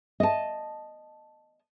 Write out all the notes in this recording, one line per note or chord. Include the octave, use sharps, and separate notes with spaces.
D#5 A5